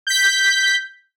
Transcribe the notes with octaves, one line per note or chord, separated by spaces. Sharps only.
G6 B6